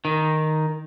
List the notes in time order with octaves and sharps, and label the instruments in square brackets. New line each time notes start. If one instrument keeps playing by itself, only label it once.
[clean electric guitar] D#3